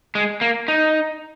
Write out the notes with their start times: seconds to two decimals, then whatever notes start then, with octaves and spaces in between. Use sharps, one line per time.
0.15 G#3
0.41 A#3
0.68 D#4